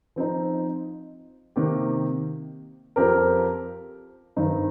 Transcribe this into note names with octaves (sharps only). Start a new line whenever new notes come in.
F3 C4 D#4
C3 D#3 A#3 G4
F2 F3 C4 G4 A#4
G2 D#3 C4 D#4